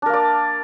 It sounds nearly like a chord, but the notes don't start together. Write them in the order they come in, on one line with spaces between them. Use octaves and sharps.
D4 A#4 A#3 D5